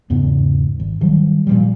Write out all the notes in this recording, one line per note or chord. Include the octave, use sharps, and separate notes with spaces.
E2 G#2 C#3 B3
G#1
D#3 F#3 G3
A#2 F3 G3